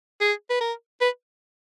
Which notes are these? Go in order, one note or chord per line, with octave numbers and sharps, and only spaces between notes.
G#4
B4
A#4
B4